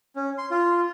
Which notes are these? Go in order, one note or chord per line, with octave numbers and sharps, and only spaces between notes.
C#4
C6
F4